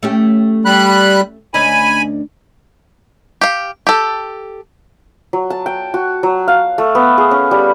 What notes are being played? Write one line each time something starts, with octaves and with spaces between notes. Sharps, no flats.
A3 C#4 G4
G3 B5 F#6
D2 C#4 D#4 G#5 B5
G4 F5
G4 A4
F#3
A5
G5
F#4
F#3
F5
A3
B3
G#4
C#4
G3